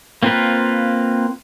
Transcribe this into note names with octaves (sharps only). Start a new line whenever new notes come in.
A#3 C4 F4 A#4 B4